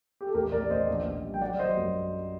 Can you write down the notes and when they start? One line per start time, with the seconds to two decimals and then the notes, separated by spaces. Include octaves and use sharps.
0.21 G4
0.27 A4
0.34 A1 G4 A#4
0.52 A1 A#4 D5
0.70 A1 C5 D#5
0.88 A#1
1.06 A#1
1.24 G3
1.34 G5
1.41 F#3 D5 F#5
1.59 F#3 C5 D#5
1.77 F#2